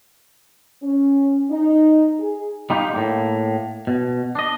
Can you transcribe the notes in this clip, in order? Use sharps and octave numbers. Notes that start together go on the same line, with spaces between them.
C#4
D#4
G#4
G3 D#4 F4 G4
A2 A#3
B2
D4 D#5